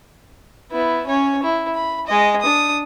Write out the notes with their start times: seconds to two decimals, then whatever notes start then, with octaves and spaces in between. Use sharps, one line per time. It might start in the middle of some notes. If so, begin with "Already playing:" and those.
0.72 B3 E4
1.07 C#4 C#5
1.43 E4
1.75 B5
2.07 G#3 D#5
2.42 D4 D#6